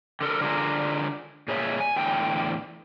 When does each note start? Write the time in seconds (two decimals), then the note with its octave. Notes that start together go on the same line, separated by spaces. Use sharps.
0.21 D3 A4 A#4
0.41 D3 D4 F4 G#4 A#4
1.48 A#2 G#4 C#5 E5
1.80 G#5
1.96 E2 A2 D3 G5